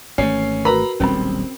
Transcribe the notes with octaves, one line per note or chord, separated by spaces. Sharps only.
G#1 E3 A3 C#4 C7
F#4 A#4 B4 A#5 B5
D#1 B1 G3 C4 C#4 B5